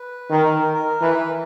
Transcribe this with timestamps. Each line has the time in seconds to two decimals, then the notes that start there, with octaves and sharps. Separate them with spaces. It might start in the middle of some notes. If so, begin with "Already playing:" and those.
Already playing: B4
0.31 D#3 A#4
0.74 A#4
1.01 E3 B4